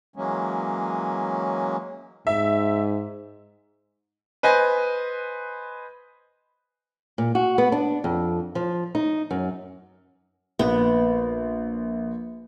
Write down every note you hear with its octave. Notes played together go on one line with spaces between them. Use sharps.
E3 F#3 G#3 A#3 C#4
G#2 E5
B4 C5 D#5 G#5
A#2
F#4
B3
D4
F2
F3
D#4
F#2
A#1 B3